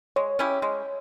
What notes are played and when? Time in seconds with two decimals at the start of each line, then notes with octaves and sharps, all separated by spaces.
0.16 G#3 C#5
0.39 C#4 E4 G4
0.62 G#3